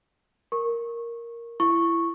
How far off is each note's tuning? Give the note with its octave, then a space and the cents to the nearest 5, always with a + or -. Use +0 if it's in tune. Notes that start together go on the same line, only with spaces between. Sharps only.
A#4 +0 C#6 -20
E4 +25 C#6 -5